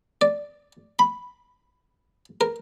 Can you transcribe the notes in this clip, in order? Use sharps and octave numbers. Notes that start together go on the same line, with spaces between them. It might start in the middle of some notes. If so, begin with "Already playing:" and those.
D5
B5
A#4